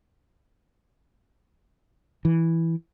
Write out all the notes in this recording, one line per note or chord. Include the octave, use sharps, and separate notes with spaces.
E3